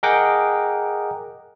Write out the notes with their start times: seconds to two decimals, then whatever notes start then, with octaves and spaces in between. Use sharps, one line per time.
0.03 G#4 A#4 D#5 F#5 G5 D6